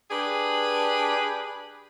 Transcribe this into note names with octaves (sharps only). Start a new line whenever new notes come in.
D4 G4 G#4 B4